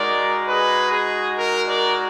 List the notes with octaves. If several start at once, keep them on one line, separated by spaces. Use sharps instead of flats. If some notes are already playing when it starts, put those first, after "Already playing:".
Already playing: G#3 D#4 F#4 A#4 D5
G#4 B4
G#4
A#4
A#4 D5